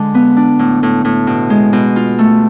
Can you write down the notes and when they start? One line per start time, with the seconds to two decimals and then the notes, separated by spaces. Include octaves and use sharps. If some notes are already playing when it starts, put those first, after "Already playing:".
Already playing: D3 G#3
0.15 B3
0.37 D4
0.59 A2
0.83 A2
1.05 A2
1.27 B2
1.50 G#3
1.73 B2
1.96 F4
2.19 A3